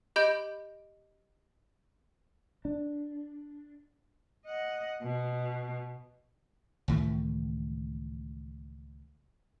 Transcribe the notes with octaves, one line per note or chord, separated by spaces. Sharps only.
G4 D#5 B5 G6 D7
D4
D#5 F#5
B2
C#2 A2 D#3 E3